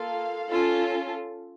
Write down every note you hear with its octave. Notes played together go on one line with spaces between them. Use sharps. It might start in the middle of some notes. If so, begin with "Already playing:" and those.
Already playing: A#3 F4 A4 F5
C#4 F4 A4